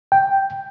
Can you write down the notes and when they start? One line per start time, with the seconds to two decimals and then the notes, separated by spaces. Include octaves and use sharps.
0.12 G5